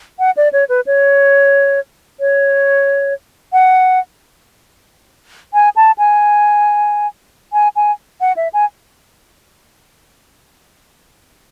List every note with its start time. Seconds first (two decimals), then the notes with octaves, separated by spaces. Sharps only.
0.19 F#5
0.37 D5
0.53 C#5
0.69 B4
0.86 C#5
2.20 C#5
3.53 F#5
5.54 G#5
5.76 A5
5.98 G#5
7.53 G#5
7.76 G#5
8.21 F#5
8.37 E5
8.53 G#5